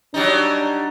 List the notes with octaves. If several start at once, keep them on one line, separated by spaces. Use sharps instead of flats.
F#3 G3 D4 D#4